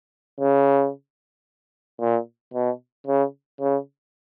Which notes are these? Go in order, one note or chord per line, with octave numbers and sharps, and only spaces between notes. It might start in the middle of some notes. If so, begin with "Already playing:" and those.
C#3
A#2
B2
C#3
C#3